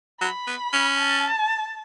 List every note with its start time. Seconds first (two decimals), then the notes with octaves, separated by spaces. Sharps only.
0.21 F#3 B5
0.47 B3
0.73 C#4
0.99 A5